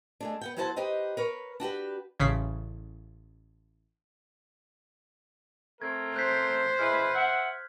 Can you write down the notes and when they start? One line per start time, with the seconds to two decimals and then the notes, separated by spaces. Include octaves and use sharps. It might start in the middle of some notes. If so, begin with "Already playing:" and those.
0.20 G#3 A3 D4
0.41 B3 F#5 G5
0.56 F#3 B3 E4 F#4 C5 A5
0.76 D#4 G4 B4 C5 D#5
1.17 A#4 B4 C#5
1.60 D4 F#4 G4 B4
2.20 A1 C#3 B6 C7
5.82 A3 C4 A#4 G#6
6.16 C5 F#6 G6 B6
6.79 G#3 E4 B4 F6
7.14 E5 F#5